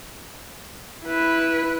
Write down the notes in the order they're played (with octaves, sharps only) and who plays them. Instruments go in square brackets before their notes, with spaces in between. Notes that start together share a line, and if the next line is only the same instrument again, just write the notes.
[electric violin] E4 B4